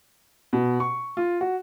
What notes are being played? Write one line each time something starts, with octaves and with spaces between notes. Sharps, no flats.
B2
C#6
F4
F#4